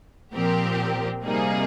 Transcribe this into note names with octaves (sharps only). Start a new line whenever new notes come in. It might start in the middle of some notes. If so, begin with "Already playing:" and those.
A#2 F3 C4 G4 A#4
C3 G3 A#3 D#4 G#4